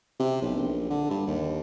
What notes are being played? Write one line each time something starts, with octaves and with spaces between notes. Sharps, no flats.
C3
B1
A#1
D3
G2
D#2